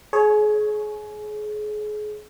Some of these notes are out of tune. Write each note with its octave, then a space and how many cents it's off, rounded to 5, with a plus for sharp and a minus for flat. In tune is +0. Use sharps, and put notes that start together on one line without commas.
G#4 +30 C#5 +0